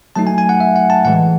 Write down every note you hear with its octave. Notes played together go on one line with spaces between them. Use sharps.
F#3 A3 D#4 A5
G#5
G#5
F#5
E5
F#5
A5
A2 E3 G#3 F#5